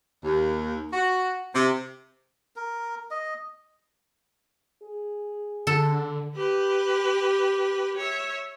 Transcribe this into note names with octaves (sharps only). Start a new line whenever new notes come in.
D#2
F#4
C3
A#4
D#5
G#4
D3 A4
G4 B4
C#5 E5